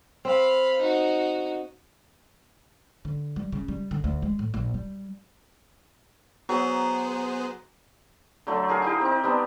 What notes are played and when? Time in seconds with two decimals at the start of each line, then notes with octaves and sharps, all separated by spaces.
0.25 C4 F5 B5
0.79 D#4 F#4
3.05 D3
3.36 G3
3.52 C#3
3.68 G3
3.91 D3
4.04 D2
4.22 G#3
4.39 A2
4.54 A#1
4.74 G3
6.49 F#3 B3 G#4 C5
8.47 D3 F#3 A3 A4
8.68 G4 G#4 A#4 F5
8.82 D#4 E4 G4
9.01 C4 D#4
9.24 G3 B3 D4